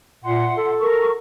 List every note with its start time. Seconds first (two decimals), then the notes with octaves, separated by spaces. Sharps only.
0.24 A#2 E5 F#5 C6
0.57 A4
0.78 A#4 C#6